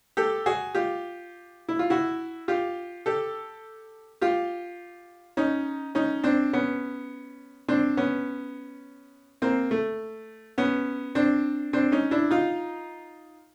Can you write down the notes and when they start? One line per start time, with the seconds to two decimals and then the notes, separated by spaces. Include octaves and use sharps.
0.17 G4 A4
0.46 F#4 G#4
0.75 F4 G4
1.69 E4
1.79 F4
1.90 E4 F#4
2.48 F4 G4
3.06 G4 A4
4.21 F4 G4
5.37 C#4 D#4
5.95 C#4 D#4
6.24 C4 D4
6.53 B3 C#4
7.68 C4 D4
7.97 B3 C#4
9.42 A#3 C4
9.71 A3
10.58 B3 C#4
11.15 C4 D4
11.73 C4 D4
11.92 C#4 D#4
12.11 D4 E4
12.31 D#4 F4